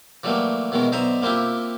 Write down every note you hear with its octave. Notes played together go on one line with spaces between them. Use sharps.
E3 F#3 G3 A3 A#3
B2 D#3 E3 G#3 C#4
B1 D3 C5 D#5 E5 A#5
A#3 C4 E4 F4 G4